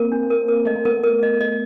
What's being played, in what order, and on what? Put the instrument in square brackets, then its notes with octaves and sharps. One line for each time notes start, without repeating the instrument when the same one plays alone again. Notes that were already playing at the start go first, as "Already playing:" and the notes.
Already playing: [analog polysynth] A#3 C4 [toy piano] A#4
[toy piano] D4
A#4
A#4
[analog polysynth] A3 [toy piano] D#5
[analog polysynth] A#3
[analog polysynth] A3 B3 [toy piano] A#4
[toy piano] A#4
D#5
D#5